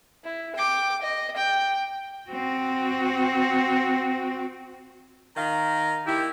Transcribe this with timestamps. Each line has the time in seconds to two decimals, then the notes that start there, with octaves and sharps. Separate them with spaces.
0.24 E4
0.55 G5 D6
1.02 D#5
1.36 G5
2.30 C4 F#4
5.37 D#3 F5 A#5
6.06 D#3 A#3 E4 G4